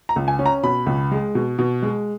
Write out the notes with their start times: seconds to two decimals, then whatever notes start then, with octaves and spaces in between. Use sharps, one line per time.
0.09 A#5
0.16 C#2
0.28 G#5
0.39 C#4
0.46 A#5
0.63 B2 B5
0.86 C#2
1.11 G#3
1.35 B2
1.58 B2
1.82 G#3